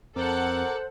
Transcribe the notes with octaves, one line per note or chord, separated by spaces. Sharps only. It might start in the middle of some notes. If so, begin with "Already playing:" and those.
F2 A4 A#4 C5 F#5 D6